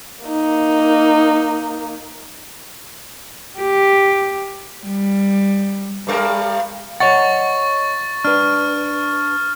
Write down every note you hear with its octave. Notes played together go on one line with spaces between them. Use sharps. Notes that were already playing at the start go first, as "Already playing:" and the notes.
A#3 D#4
G4
G3
G2 G3 A#4
C#5 D#5 F#5 C#6 A6
D4 B4 F6